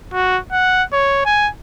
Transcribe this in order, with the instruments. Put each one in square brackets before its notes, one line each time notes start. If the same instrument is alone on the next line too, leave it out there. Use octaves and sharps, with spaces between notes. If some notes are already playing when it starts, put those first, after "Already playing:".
[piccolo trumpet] F#4
F#5
C#5
G#5